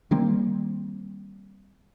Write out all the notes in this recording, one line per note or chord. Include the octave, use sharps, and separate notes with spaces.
D#3 G3 A#3 C4